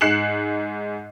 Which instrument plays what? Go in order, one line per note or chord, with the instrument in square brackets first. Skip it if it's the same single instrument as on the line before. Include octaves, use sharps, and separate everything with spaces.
[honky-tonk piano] G#2 F#6 C7 C#7 E7 F#7